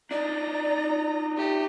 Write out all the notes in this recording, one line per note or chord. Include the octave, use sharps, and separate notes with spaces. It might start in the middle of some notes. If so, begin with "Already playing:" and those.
D4 D#4 D5 A#5
A3 G4